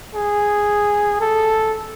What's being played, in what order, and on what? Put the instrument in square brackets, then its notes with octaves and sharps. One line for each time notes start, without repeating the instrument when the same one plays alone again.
[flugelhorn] G#4
A4